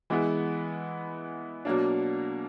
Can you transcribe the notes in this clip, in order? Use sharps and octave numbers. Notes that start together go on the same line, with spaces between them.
E3 G#3 B3 E4
B2 F#3 A#3 D4